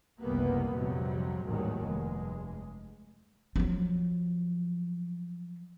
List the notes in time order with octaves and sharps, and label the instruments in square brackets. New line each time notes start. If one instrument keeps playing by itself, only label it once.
[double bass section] F#1 C2 C3 G3 A#3 B3
A#1 F2 C3 F#3 G3
A1 D#2 G#2 D#3 F#3 G3
F1 G2 G#3
[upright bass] F3 F#3